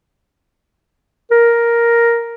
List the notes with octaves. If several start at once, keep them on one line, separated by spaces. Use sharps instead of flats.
A#4